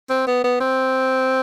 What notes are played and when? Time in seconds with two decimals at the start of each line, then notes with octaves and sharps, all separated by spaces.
0.10 C4
0.27 B3
0.44 B3
0.60 C4